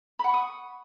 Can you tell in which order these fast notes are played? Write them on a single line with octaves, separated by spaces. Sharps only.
B5 F#5 C#6 D#6